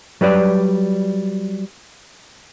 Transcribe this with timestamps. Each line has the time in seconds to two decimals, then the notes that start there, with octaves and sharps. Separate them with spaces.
0.21 F#3 G3 B4 D5